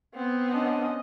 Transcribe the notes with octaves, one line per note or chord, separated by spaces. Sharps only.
B3 C4
C#4 D4 D#5